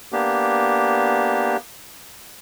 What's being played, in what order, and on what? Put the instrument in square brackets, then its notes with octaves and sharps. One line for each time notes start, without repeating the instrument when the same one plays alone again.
[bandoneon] A#3 B3 D4 G4